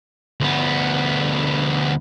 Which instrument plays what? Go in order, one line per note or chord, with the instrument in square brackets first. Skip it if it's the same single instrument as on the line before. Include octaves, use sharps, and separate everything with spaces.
[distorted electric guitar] D2 B3